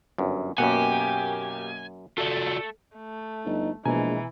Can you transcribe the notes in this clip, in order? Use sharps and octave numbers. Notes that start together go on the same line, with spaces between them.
G1 F#2
F#2 B2 A#3 G4 F#5 G#5
A3 F4 F#4 A4 D5
A3
G1 D#4
A#1 B2 E3 G#3 G#5 A#5